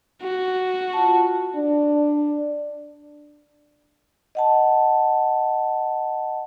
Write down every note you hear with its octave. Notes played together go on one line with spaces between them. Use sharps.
F#4
F4 F#5 A5
D4
D#5 F#5 A5